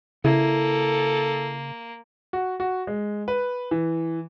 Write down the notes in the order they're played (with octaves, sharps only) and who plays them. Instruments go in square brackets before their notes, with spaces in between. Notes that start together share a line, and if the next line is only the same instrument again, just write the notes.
[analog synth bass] C#3 [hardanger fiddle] A#3 [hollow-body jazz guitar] E4 [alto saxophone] A4
[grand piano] F#4
F#4
G#3
B4
E3